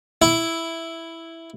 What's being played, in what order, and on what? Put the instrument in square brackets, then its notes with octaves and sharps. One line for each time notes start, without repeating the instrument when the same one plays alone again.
[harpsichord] E4